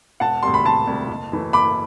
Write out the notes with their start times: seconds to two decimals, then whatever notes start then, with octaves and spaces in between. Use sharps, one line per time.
0.20 E1 F#5 A5
0.43 D2 C3 G3 C6
0.54 B5
0.65 E1 A5 C6
0.87 D2 C3 G3
1.09 F#1
1.32 F#2 E3 A3
1.53 F#1 B5 D6